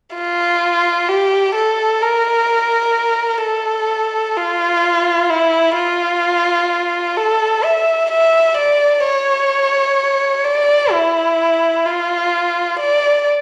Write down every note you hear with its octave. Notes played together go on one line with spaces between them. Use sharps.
F4
G4
A4
A#4
A4
F4
E4
F4
A4
E5
E5
D5
C#5
D5
E4
F4
D5